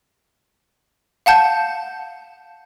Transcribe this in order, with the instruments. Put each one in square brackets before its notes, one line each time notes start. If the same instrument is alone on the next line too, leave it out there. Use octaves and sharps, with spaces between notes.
[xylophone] F5 F#5 A5 G6